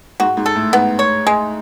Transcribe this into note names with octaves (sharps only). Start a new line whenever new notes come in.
G#2 F#4
G#2
A4
A2
G#2 B3
C#5
G#3